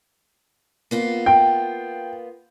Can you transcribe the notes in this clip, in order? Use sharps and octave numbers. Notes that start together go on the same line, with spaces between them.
A#3 B3 F4
G5